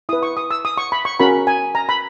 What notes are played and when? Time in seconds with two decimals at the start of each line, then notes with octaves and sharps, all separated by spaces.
0.09 E4 B4 D#6
0.23 C#6
0.37 D#6
0.51 E6
0.65 D#6
0.78 C#6
0.92 B5
1.05 C#6
1.20 C#4 F#4 A#4 B5
1.47 G#5
1.75 A#5
1.89 B5